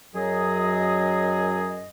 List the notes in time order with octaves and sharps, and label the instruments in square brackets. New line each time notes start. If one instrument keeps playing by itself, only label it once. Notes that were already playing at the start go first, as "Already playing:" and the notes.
[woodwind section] F#2 F#3 G#4 D#5